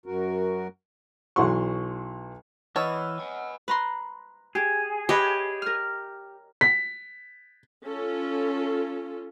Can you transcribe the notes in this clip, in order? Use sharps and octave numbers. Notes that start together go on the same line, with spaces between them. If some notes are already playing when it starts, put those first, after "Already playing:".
F#2 F#4 A#4
B1 E3 F#3 F#5 C6 C#6
E3 B3 C#5 D#5 A5 E6 F6
F#5 G#5
B4 A#5 C6
G4 G#4
G4 B4 C#5 D#5
A#4 F6
B6
C#4 F4 A4